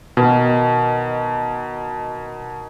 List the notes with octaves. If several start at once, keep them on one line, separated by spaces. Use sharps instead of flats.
B2 D#3